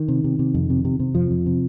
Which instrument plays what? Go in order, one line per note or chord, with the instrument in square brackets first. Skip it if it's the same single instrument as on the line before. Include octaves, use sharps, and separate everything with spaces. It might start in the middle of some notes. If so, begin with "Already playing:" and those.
Already playing: [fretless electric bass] D#3
C3
C3
C3
F2
C3
C3
C3
F2 F3
F2
C3